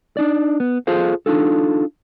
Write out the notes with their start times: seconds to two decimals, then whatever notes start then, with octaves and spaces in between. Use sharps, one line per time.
0.17 D4 D#4 D5
0.60 B3
0.87 F4 G#4 A4 C5 F5
1.26 D4 D#4 F4 A4